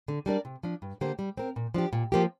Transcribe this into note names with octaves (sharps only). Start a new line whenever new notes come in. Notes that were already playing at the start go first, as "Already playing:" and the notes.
D3
G3 D4 A#4 D5
C3
F3 D4
G2
D3 A#3 G4 C5
G3
C4 A#4
A#2
F3 D4 G4
A#2
F3 A#3 G4